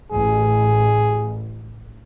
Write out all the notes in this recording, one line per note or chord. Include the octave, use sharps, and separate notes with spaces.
A1 G#4